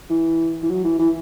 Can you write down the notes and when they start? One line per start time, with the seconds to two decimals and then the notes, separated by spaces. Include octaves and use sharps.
0.10 E3
0.63 E3
0.69 F#3
0.84 E3
0.99 E3